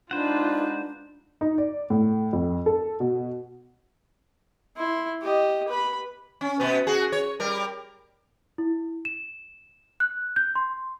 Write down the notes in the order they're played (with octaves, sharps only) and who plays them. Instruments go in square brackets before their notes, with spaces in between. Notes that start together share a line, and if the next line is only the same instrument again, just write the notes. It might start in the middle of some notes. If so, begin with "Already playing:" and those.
[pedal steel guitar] G#3 C5 F#5 [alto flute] D4 [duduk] D#4 [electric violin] F4 B4
[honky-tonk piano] D#4
D5
A2
F2
A4
B2
[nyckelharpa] E4 C6
G4 D#5
B4 B5
[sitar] C#4
B2 B3
F#4 G#4
C#5
G3 A#4
[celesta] E4
E7
F#6
G6
C6